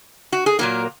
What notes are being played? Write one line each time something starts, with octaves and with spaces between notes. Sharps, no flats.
F#4
G#4
A#2 F#3 A#3 A#4